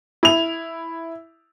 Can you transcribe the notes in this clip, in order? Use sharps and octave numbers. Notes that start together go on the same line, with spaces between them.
E4 F7